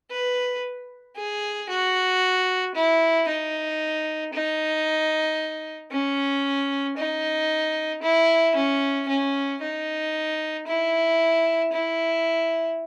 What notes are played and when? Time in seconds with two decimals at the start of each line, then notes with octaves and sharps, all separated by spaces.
0.11 B4
1.17 G#4
1.69 F#4
2.75 E4
3.28 D#4
4.33 D#4
5.91 C#4
6.97 D#4
8.03 E4
8.55 C#4
9.08 C#4
9.62 D#4
10.67 E4
11.73 E4